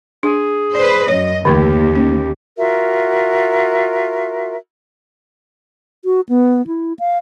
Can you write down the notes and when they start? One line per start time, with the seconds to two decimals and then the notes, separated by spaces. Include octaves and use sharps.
0.23 D4 G#4
0.75 B4 C5 D5
1.08 F#2 C#5 D#5
1.45 D#2 D3 E3 A3 G4
1.95 C#4
2.57 F4 F#4 A#4 E5
6.05 F#4
6.29 B3
6.67 E4
6.99 F5